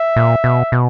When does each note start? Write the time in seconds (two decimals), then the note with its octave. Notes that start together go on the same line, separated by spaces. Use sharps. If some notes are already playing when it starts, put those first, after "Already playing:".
Already playing: E5
0.16 A#2
0.44 B2
0.72 B2